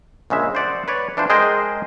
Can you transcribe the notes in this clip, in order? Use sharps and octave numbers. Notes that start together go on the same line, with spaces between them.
A#1 C#3 G#3 E5
C5 D5 F#5
B4 C#5 D5
E3 D4 F4 C5
G#3 G#4 A#4 C5 D#5 G5